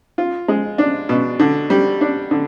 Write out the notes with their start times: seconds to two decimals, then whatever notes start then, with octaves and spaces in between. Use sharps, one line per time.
0.18 F4
0.48 G#3
0.78 D4
1.09 B2
1.39 D3
1.70 G3
2.01 D4
2.31 D3